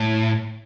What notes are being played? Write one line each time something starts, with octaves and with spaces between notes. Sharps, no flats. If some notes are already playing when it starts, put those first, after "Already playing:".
Already playing: A2